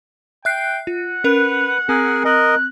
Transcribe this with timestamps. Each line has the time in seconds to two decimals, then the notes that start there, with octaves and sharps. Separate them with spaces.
0.45 E5 G5 F#6 C7
0.87 F4 F#5
1.24 C#4 A#4 B4 F7
1.89 C4 G#4 A#4 G#5
2.25 A#4 D#5 F#6